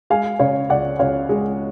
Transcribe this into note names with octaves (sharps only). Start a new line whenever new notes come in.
G#3 F5 G#5
C#3 C#5 F5
C#2 D5 F#5
C#2 C#5 F5
G#3